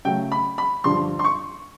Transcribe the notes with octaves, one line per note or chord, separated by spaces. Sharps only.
C#3 F#3 A3 G5
B5
B5
G2 D3 F3 C6
C6
C#6